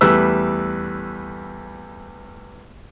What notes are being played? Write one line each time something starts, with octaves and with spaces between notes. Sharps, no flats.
E2 G3 A3 B4 E6